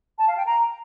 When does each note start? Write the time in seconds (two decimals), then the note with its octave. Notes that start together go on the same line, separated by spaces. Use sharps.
0.18 A5
0.27 F5
0.37 G5
0.46 A#5